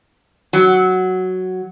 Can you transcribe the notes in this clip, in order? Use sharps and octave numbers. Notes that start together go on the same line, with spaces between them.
F#3